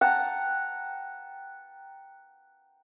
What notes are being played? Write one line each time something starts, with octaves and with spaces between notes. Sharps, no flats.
F#5 G5 A5 A#5